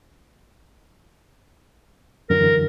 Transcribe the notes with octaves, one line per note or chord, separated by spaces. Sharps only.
F#2 D3 E3 A#4